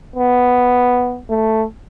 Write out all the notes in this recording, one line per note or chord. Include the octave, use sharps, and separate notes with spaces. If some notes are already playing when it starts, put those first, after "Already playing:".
B3
A3